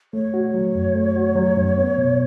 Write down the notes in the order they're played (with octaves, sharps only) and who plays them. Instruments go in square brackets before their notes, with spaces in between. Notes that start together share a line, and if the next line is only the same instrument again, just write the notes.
[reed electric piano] A3 [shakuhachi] C#5
[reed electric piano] F#4
F#3
F#2
A3
F#4
F#3
F#2
B3
B2